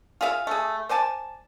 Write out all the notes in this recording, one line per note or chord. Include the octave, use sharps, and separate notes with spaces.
F4 G#4 E5 F5
A3 G#4
C5 D5 G#5 A5